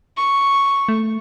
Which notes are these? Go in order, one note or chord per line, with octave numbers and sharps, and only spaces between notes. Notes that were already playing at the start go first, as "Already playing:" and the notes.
C#6
A3